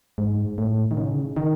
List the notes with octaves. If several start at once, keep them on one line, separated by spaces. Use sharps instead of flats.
G#2
A2
D#3
C#3
D#3